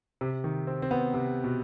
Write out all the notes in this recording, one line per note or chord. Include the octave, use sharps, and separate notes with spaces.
C3
D#3
C4
C4
B3
C3
B2